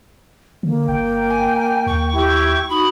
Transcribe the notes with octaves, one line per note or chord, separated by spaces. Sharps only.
D3 A#3
G1 G5
G#5
D#2 C#6
A3 E4 G4
D#4 F#4 B5 D#6